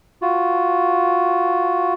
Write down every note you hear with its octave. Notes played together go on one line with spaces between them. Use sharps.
F4 F#4